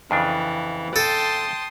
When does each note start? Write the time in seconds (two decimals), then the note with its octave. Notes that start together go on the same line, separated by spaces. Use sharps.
0.11 F2 C#3 E3 D4
0.96 A4 G5 A5 C6 D#6